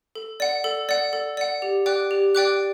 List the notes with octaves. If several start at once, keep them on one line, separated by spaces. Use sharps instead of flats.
A4
D5 F#5
A4
D5 F#5
A4
D5 F#5
G4
D5 G5 D6 F#6
G4
D5 G5 D6 F#6